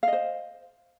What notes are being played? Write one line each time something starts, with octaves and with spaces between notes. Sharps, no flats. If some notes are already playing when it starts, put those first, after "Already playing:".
C5 D#5 F5